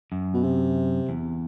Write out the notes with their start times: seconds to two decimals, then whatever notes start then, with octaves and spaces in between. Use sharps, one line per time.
0.12 F#2
0.34 B2
0.44 C3
1.09 E2